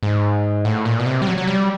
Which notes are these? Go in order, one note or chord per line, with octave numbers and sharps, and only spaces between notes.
G#2
A2
A#2
B2
C3
G3
F#3
F#3
G3